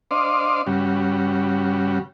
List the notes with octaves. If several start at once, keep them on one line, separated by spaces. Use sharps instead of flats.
D4 C5 D5 D#5 F5 C6
G2 C#3 G3 F#4